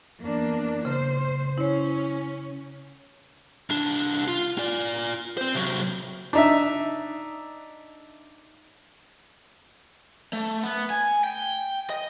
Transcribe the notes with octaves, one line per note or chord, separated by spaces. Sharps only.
E2 A#3 D4
C#3 C5
C#4 E4 C#5
C2 D4
F4
F4 D5
C4 C5
C3 F#3
D4 D#4 E5
A3
B3
G#5
G5
D#5